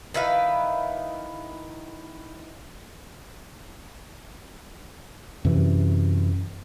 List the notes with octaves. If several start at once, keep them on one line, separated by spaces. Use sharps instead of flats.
D#3 E4 B4 F5
F#2 C3 E3